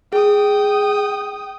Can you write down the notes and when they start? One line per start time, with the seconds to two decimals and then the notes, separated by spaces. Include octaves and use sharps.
0.13 G#4 G5 D#6